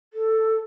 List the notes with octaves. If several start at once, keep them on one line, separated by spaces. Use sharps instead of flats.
A4